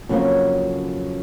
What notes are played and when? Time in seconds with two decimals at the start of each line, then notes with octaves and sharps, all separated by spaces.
0.09 F2 C#3 F#3 A#3 C#4